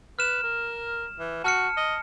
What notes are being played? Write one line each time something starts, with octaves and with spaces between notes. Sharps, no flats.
B4 F6 E7
A#4
E3
F#4 A5 F6 C#7
D#5